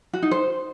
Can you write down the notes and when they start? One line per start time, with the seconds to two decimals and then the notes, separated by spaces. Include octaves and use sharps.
0.13 F#4
0.22 D#4
0.31 C5